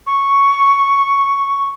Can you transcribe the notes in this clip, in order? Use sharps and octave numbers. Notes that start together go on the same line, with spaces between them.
C#6